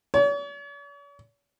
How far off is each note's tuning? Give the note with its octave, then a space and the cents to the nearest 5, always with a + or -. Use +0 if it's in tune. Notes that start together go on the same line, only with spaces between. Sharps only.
C#5 +45